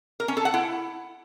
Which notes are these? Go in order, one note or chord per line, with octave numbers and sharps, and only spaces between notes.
A#4
C#4
A4
F#5
E4